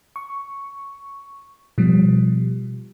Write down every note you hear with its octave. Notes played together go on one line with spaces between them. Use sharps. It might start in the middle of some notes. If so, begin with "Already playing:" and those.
C#6
B2 F3 G3